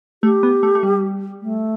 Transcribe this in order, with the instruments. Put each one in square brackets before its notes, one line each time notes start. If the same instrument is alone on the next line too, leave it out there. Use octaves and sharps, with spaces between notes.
[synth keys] A3 [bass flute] G4
[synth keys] B3
A3
A3
G3
[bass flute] A3